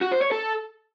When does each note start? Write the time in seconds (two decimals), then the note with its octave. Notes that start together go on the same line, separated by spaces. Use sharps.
0.01 F#4
0.11 C5
0.21 C#5
0.32 A4